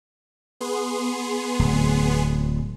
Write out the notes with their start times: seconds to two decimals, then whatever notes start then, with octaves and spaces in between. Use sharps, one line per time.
0.61 B3 G#4 C6
1.59 D1